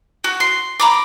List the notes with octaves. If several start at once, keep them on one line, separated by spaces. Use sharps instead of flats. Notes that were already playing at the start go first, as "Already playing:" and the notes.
F#4
C6
A#5 B5 D6